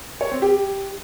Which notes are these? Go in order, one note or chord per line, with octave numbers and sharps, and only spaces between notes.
C#5
C4
G4